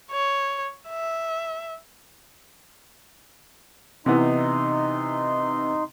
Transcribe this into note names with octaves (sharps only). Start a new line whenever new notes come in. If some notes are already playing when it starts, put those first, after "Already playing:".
C#5
E5
C3 E3 B3 D#4 C6